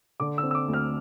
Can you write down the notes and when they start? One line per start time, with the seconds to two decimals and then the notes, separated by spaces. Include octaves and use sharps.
0.20 D3 D6
0.38 E6
0.43 C4
0.51 E6
0.55 D6
0.68 D2
0.74 F6